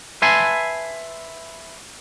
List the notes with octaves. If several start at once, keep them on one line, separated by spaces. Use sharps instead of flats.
B4 E5 G#5 A5 C6